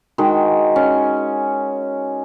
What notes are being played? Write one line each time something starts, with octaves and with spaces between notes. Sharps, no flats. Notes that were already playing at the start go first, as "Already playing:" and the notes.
D#3 G#3 F#4
C#4